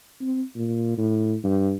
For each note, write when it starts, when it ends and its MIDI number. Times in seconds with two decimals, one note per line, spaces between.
0.20 0.42 60
0.56 0.97 46
0.97 1.36 45
1.44 1.75 43